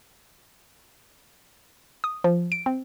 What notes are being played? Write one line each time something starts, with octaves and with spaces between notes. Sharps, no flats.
D#6
F3
D7
C4